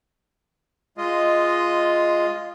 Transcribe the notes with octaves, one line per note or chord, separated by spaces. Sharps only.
G#3 F4 D#5